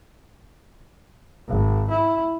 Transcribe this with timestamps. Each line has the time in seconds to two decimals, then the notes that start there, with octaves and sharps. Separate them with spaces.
1.48 G#1
1.90 E4